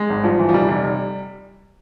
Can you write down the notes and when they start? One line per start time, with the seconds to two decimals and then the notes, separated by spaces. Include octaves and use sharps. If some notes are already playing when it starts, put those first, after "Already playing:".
Already playing: G#3
0.09 G#1
0.24 G2 F3
0.39 E3
0.49 F3
0.54 F1 G3
0.69 F1
0.84 F1